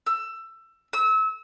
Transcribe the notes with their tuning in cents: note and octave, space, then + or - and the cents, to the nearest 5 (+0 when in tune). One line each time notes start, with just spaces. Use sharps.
E6 +20
E6 -30